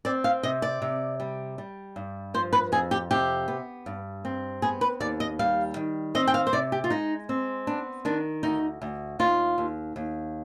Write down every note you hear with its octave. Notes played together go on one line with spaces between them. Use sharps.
C4 D5
F5
C3 D#5
D5
C3
G3
G3
G2
F3 C5
B4
F2 G#4
G4
C3 G4
B3
G2
C4
B3 G#4
B4
D#2 D5
D#5
G3 F5
D#3
C4 D#5
G5
F5
C5
C3 D5
G4
F4
G#3 D#4
C4
B3 D4
D#3 D4
D2 D#4
D2
D#2 F4
D#2
D#2